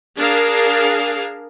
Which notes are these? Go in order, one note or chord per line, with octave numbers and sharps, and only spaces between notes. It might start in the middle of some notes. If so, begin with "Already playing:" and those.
D4 G#4 A#4 F5